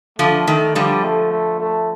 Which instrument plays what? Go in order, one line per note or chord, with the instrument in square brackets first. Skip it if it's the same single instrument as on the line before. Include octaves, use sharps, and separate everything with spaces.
[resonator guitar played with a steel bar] D3 F3 [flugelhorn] A3
[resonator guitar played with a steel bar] D#3 [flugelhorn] A3
[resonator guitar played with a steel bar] D3 F3 [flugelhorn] G3
[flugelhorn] A3
A3
A3